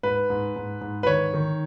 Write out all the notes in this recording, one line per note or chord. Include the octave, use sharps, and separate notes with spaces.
G#2 B4
G#2
G#2
G#2
B4
D#3 C#5
D#3